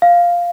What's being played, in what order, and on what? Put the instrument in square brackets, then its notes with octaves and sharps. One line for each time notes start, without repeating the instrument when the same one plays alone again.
[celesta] F5